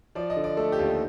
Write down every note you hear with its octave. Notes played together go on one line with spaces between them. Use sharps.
F3 D5
D#5
D3
D5
A3 A4
G4
D#2
D#4